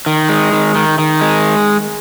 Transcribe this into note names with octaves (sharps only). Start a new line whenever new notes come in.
D#3
G#3
D#3
D#3
D#3
G#3